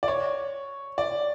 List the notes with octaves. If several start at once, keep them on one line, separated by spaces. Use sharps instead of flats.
D5
C#5
D5